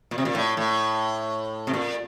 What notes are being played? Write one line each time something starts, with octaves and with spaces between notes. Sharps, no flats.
A#2
C3
A#2
A2
A2
C3
A#2